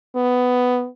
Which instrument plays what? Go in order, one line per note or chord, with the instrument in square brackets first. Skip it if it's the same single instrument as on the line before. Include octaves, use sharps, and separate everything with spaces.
[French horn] B3